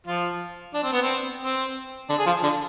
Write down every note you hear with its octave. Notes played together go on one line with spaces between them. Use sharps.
F3 F4
D4
C4
B3
C4
C4
D3 D4
G#4
F3 F4
D3 D4